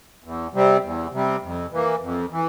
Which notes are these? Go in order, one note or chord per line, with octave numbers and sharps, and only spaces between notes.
E2
C3 G3 C4
E2
C3 G3 C4
F2
E3 A#3
F2
E3